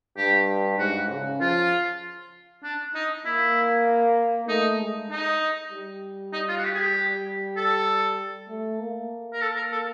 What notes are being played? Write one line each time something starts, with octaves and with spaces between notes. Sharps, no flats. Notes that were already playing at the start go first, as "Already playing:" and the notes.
G2 G4
G#2 F#4
C#3
F3 F4
D4
D#4
A#3 E4
A3 D#4
G#3
D#4
G3
D#4
F4
F#4
G4
G#4
G4
A4
A3
A#3
A#4
A4
A#4
A4